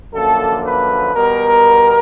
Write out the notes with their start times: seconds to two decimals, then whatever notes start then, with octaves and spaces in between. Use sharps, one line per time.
0.13 F#2 D3 F3 A#3 A4
0.64 B4
1.14 B2 G3 B3 A#4